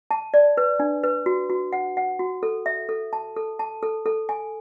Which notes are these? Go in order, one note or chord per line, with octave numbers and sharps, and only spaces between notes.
A5
D5
B4
D4
B4
F#4
F#4
F#5
F#5
F#4
A4
E5
A4
A5
A4
A5
A4
A4
G#5